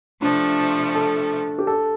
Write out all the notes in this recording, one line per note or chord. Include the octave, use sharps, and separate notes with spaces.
C3 F3 A3 D4
A4
G4
A4